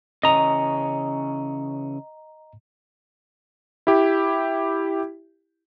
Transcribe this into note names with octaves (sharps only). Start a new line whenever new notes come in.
C#3 E3 C#4 D#5 A#5
E4 G4